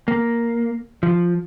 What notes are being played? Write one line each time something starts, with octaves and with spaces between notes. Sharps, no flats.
A#3
F3